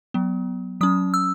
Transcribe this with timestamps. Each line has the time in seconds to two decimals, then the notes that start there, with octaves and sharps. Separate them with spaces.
0.14 F#3 B3
0.81 F#3 C#4 D#6
1.14 E6